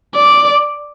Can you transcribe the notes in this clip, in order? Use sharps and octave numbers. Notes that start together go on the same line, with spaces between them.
D5